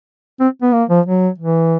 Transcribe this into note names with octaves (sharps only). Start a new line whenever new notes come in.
C4
B3
A#3
F3
F#3
E3